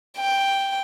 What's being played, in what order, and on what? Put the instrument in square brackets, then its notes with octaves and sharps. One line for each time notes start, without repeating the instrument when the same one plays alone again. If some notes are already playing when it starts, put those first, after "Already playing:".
[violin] G5